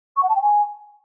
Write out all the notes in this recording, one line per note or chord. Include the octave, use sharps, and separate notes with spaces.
C#6
F#5
A5
G5
G#5